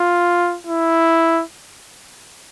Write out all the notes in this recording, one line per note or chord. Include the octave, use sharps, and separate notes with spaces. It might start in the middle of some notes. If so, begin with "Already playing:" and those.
Already playing: F4
E4